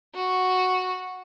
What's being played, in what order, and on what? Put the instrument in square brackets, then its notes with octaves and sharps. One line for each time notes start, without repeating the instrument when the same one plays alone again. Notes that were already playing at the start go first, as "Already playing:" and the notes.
[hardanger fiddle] F#4